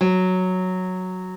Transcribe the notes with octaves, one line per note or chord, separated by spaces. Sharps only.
F#3